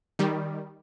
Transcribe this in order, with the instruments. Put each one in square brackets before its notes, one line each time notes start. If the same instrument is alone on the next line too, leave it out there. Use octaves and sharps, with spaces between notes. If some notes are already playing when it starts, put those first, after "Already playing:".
[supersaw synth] D#3 G3